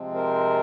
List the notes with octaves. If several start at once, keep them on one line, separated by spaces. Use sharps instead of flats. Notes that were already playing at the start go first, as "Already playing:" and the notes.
Already playing: C3 F3 G#3 C4
A#4 C5